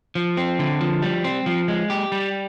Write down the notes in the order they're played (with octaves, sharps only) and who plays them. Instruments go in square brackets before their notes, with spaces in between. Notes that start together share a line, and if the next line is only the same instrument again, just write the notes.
[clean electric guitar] F3
C4
D3
F3
G3
C4
F3
G#3
G4
G3